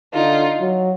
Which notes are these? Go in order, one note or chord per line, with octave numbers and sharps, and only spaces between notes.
D3 D#4 F4
F#3